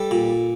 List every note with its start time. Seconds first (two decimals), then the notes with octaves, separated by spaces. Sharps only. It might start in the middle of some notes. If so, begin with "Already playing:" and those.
Already playing: G3 A4
0.11 A#2